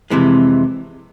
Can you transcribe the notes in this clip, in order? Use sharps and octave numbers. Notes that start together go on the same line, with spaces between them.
F2 C3 E3 G#3